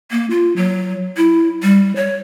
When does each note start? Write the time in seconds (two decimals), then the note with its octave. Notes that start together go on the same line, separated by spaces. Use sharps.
0.11 A#3
0.30 F4
0.56 F#3
1.17 E4
1.63 G3
1.96 C#5